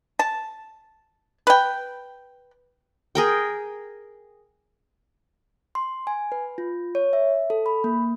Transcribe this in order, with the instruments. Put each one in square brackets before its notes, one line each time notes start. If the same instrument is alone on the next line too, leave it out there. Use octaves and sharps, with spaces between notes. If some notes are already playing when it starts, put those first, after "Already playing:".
[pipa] A5
B4 G5
[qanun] G#4 A#4 G5
[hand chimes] C6
G#5
B4
F4
C#5
E5
A4
B5
A#3